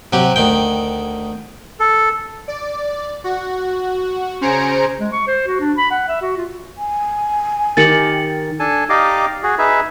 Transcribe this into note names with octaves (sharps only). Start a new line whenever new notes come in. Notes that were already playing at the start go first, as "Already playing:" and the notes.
C3 F#3 G4
D2 D#3 G5
A4
D5
F#4
C#3 C5 G#5 A#5 C#7 D7
G#3
C#6
C5
F#4
D4
B5
F#5
E5
F#4
F4
G#5
D#3 G4 A#4 A6 C#7 F#7
D4 A4 G#5 A5
D#4 G4 D5 D#5 F5 D6
F#4 G#4
D#4 G#4 B4 E5